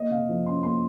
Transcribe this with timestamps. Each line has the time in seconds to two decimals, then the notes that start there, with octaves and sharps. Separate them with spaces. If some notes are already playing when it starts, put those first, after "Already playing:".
Already playing: A#3 D#5
0.11 C3 F5
0.29 F3
0.46 C#4 C6
0.63 A#3 C6